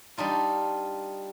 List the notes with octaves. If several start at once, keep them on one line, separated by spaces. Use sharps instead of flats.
G3 D4 D#4 F4